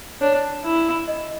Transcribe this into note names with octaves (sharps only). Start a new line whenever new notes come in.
D4 C#5
E4
D#5